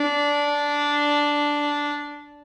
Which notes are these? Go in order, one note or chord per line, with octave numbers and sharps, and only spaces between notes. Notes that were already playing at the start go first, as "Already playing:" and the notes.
Already playing: D4